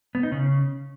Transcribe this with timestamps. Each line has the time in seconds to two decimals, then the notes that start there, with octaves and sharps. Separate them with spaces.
0.15 B3
0.23 D#4
0.32 C#3